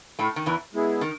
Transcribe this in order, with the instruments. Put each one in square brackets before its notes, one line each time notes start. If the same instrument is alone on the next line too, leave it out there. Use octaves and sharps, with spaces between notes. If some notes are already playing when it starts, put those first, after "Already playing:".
[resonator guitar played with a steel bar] A2 A3
D#3
E2 E3
[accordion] G#3 B3 E4 G#4
[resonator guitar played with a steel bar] D#3